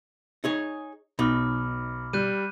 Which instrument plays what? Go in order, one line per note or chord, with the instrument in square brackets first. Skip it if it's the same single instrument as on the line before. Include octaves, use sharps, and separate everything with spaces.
[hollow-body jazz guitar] D#4 G#4 C#5
[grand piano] B1 [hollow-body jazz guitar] B2 D#4 [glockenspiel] B5 D6 F6
[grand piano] G3 [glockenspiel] F#6 G6 D#7